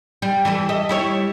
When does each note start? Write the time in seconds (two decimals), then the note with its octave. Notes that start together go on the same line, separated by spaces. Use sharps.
0.22 G3
0.45 E3 G3 A4
0.69 D#5 E5
0.89 G3 E4 C#5